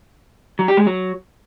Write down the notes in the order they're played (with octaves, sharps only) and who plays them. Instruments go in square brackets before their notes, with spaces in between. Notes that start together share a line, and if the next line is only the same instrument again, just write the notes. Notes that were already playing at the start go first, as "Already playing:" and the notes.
[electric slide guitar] F#3
G4
G#3
F#3